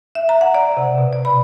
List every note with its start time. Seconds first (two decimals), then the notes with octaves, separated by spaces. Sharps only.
0.15 E5
0.29 A#5
0.41 F#5
0.55 D5
0.77 C3
0.98 B2
1.13 D5
1.25 B5